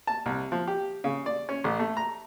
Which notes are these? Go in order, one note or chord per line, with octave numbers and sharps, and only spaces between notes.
A5
C2
F3
G4
C#3
D5
C#4
A1
A3
A#5